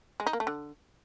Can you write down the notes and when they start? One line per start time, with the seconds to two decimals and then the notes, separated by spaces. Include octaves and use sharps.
0.20 G#3
0.26 D#4
0.33 A#3
0.40 A3
0.47 D3